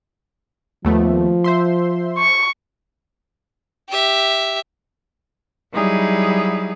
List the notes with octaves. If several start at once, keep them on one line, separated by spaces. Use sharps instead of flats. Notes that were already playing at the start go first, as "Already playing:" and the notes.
D#2 F3 A3 B3
C5 E5 C6
C#6
G4 E5
F#3 G3 D#4 E4 G#4